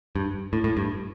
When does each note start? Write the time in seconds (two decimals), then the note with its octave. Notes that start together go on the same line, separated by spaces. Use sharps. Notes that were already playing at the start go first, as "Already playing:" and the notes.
0.16 G2
0.53 A2
0.64 A2
0.77 G2